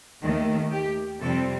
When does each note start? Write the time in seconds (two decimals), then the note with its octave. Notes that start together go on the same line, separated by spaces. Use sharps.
0.23 D#2 D#3 A3
0.71 G4
1.20 F2 C3 G3 C4 A4